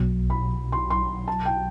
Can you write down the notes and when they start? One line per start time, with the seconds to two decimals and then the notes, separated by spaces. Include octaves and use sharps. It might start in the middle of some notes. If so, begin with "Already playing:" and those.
Already playing: B1 B2 F#3
0.30 B5
0.72 C6
0.90 C6
1.28 A5
1.45 G5